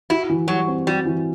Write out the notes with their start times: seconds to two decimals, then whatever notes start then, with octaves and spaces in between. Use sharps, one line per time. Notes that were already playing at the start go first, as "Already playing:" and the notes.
0.10 E4 F#4
0.30 E3
0.48 F#3 G3
0.67 C4
0.87 G3 F#4
1.05 E3